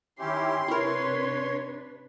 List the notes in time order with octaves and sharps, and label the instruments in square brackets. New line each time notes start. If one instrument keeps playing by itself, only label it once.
[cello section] D#3 [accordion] C#4 E4 G4 [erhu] C6
[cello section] C3 D4 B4 [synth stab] E4 A#4 [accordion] C#5